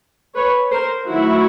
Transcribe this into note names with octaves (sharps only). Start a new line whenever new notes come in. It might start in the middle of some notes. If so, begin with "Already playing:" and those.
B4 C#5
A#4 C5
D#3 F#3 A3 E4 F#4